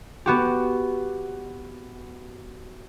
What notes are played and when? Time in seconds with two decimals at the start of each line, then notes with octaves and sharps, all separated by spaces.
0.26 B3 F#4 G4